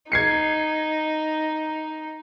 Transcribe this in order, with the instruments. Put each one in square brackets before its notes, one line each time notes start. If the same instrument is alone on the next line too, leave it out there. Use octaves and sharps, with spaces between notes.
[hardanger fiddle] D#4 [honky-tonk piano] G#6 C7 C#7